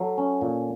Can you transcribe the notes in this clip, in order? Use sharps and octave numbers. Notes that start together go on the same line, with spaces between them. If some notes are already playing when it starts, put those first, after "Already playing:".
Already playing: F#3 A4
C#4
A#2